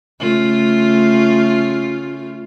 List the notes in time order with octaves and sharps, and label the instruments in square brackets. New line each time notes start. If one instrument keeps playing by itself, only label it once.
[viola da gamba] C#3 A3 F4